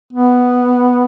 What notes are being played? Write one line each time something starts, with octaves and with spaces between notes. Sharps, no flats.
B3